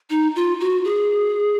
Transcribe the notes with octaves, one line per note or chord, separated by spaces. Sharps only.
D#4
F4
F#4
G#4